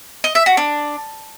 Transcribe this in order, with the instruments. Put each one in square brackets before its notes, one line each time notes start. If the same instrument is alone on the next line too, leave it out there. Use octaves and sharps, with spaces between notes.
[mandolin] D#5
E5
F#4
D4